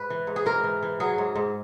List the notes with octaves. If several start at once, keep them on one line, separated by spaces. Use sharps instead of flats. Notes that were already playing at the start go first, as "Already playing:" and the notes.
Already playing: G#2 B4
E3
G#2
G#4
G#2 A#4
E3
E3
F#3 G#4
G#2
G#2